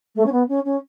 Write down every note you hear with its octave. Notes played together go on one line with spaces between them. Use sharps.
A3
C#4
B3
C#4
C#4